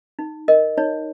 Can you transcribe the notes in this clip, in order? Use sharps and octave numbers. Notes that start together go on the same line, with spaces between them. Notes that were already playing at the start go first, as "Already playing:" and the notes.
D#4
A#4 D#5
D#4 C#5